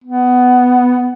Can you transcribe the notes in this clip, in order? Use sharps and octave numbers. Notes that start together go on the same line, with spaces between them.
B3